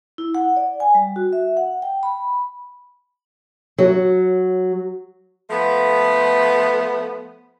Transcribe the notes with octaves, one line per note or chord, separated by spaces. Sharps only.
E4
F#5
D5
G#5
G3
F#4
E5
F#5
G5
B5
F#3
F3 A3 B3